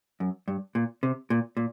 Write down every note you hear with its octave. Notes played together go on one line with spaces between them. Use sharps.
F#2
G2
A#2
C3
A#2
A#2